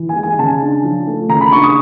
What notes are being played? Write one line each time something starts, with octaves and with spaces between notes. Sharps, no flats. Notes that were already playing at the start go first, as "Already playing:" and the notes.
Already playing: E3
G#5
G#3
G#5
C#3 A5
D4
F3
A3
C#3 A#5
B5
D4 C#6
D#6